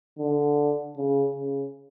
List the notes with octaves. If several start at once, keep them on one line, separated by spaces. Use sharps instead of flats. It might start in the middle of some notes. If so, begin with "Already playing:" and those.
D3
C#3
C#3